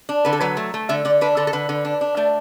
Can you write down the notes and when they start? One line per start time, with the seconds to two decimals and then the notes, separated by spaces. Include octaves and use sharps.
0.09 D4
0.25 D3 B4
0.33 A4
0.40 F#3 B4
0.57 A3
0.74 A3
0.89 D3 E5
1.05 D3 D5
1.21 D4 B4
1.37 D3 A4
1.47 A4
1.53 D3 B4
1.69 D3
1.85 D4
2.01 D4
2.17 A3 D5